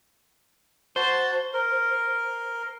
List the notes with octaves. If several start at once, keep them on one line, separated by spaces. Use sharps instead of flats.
F#4 C5 A5
A#4